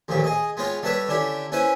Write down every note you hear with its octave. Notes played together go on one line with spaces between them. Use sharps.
A1 F2 A#2 D#3 G4
G#4 D#5
G#3 B3 F4 C#5 G5
G3 A3 A4 B4 C#5 E5
D3 C#4 D4 E4 G4
C#4 E4 B4 C5 G#5